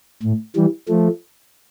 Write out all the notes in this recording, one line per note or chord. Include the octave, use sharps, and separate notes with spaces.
A2
E3 G3
F3 A3